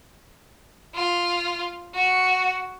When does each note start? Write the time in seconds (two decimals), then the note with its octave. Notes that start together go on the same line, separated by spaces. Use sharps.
0.95 F4
1.94 F#4